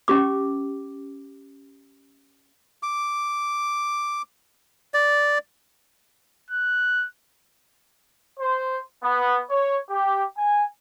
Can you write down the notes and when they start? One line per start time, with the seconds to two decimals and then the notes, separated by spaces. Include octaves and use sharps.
0.08 C#4 G4 D6
2.83 D6
4.94 D5
6.51 F#6
8.38 C5
9.02 B3
9.49 C#5
9.89 G4
10.36 G#5